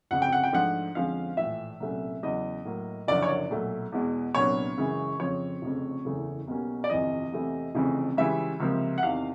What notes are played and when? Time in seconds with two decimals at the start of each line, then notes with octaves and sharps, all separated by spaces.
0.11 G1 F2 C#3 F#5
0.22 G5
0.32 F#5
0.44 G5
0.52 G#2 F3 A3 D4 F#5
0.95 F2 D3 F3 G#3 C#4 F5
1.37 A#1 A2 E3 E5
1.80 C2 A#2 F#3 A3 C#4
2.23 E2 C#3 F#3 B3 D#5
2.65 A2 F#3 A#3
3.08 F#1 F#2 D3 F3 D5
3.22 C#5
3.28 D5
3.50 B1 A#2 F#3 A3
3.92 E2 B2 G#3
4.35 C2 A#2 F#3 B3 D4 C#5
4.77 F#2 C#3 E3 G#3
5.20 F2 C#3 F3 C#5
5.62 F1 F2 C#3
6.05 F#1 E2 C#3 E3 A3
6.47 B1 B2 G3 A#3 C#4
6.84 D5
6.90 G1 F2 C3 E3 D#5
7.32 E2 C3 E3 A3
7.75 F1 F2 C#3 E3
8.17 C#2 C#3 E3 G3 E5
8.60 C#2 C3 F3 A#3
8.98 F#5
9.02 E2 C3 D#3 F5